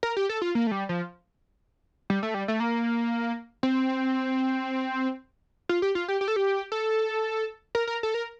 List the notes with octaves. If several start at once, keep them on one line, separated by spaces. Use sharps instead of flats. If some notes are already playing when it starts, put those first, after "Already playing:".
A#4
G4
A4
F4
A#3
A3
G3
F3
G3
A3
G3
A3
A#3
C4
F4
G4
F4
G4
G4
A4
G4
A4
A#4
A#4
A4
A#4